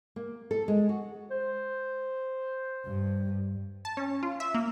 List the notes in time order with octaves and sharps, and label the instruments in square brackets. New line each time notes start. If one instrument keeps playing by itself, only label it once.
[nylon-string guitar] A#3
A4
G#3
F#4
[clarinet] C5
[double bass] G2
[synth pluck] A5
C#4
F4
E5
A#3